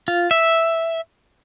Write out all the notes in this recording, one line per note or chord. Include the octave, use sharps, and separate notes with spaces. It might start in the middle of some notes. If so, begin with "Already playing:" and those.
F4
E5